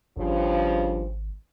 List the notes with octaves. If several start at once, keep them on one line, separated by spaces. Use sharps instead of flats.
G#1 G2 C#3 F3